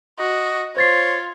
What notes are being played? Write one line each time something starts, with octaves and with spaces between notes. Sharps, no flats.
F#4 D#5
F4 C5 C#5 A6 C7